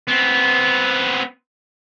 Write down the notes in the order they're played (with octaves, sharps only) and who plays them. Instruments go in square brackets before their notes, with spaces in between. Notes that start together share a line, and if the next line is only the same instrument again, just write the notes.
[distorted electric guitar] B3 C4